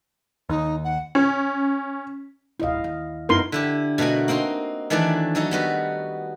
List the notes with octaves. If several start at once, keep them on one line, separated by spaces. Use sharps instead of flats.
D#2 D#4
F#5
C#4
D1 A1 E4 D#5 F5
D#2
F#2 D3 B3 D#4 E4 A#4 C6
D3 E4 G4
B2 A3 F#4 A#4 G#5
A#3 C4 D#4 C6
D#3 E3 A3 D4 A4 D5
F#3 D#4 A4 C#5
G3 B3 F#4